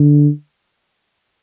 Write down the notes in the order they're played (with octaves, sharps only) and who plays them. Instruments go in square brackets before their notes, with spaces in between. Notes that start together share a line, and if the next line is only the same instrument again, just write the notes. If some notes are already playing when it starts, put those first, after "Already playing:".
Already playing: [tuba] D3